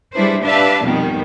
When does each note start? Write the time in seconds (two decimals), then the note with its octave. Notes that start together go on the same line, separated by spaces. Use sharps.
0.13 G3 D4 E4 G#4 B4 C5
0.42 D4 G4 B4 E5 F5 A5
0.83 F2 B2 D#3 G3 B3